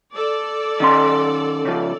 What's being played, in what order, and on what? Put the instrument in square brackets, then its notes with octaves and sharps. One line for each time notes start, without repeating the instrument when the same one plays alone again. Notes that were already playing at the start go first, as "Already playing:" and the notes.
[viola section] A4 D5
[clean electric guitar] D#3 C#4 C6
C#3 F3